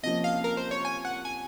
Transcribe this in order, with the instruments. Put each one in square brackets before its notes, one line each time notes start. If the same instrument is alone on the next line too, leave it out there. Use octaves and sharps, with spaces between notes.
[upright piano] C3 F3 A#3 C#4 [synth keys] D#5
[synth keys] F5
A#4
C5
C#5
G#5
F#5
G#5